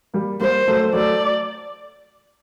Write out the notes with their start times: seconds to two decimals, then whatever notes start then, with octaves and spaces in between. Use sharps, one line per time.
0.14 G3 A#3
0.40 G3 A#3 C5
0.67 F#3 A3
0.93 F#3 A3 D5